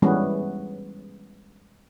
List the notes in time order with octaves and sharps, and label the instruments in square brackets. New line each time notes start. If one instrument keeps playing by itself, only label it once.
[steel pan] E3 G3 G#3 B3 C#4